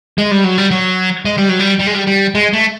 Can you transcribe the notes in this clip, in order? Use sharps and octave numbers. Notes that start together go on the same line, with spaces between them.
G#3
G3
F#3
G3
F#3
G#3
G3
F#3
G3
G3
G#3
G3
G3
G#3
A3